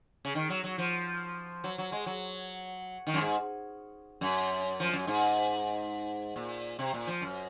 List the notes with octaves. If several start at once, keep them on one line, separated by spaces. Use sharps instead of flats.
C#3
D#3
F#3
F#3
F3
F#3
F#3
G#3
F#3
D#3
F#2
G#2
F#2
F3
F#2
G#2
A#2
C3
A#2
F3
F#2